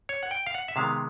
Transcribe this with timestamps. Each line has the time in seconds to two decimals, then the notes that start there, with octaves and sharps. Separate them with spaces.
0.09 C#5
0.23 F#5
0.31 G5
0.46 F5
0.54 F#5
0.68 E5
0.76 C3 D#3 G#3 B3 F5